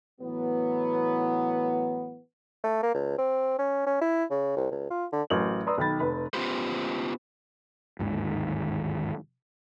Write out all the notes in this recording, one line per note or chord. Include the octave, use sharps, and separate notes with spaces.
A2 E3 F#3 B3
A3
A#3
C#2
C4
C#4
C#4
E4
C#3
C2
C#2
F4
D3
A1 F#3 A#4 F#7
B4 D5 A#5 C6 D#6 E6
B1 D#3 G5 B5 A6
F1 B4 B5
B3 C#4 F4 G4 B4 C5
G1 D#2 G#2 D#3